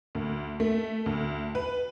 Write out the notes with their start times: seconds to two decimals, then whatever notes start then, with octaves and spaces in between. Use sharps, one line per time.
0.15 D2
0.60 A3
1.06 D2
1.55 B4